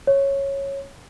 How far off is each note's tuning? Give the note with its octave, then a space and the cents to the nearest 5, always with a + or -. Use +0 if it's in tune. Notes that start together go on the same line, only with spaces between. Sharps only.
C#5 -10